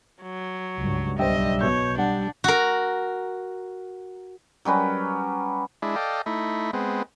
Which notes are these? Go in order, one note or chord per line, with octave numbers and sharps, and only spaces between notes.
F#3
C#2 G2
B1 G3 D4 C5 D#5 E5 G5
B2 C#5 G6
G3 D4 F#5
F#4 A#4
F#3 G3 C#4 B4
G#3 D4 E4
A4 D5 D#5 F5 G5
A3 D#4 E4
G#3 B3 C4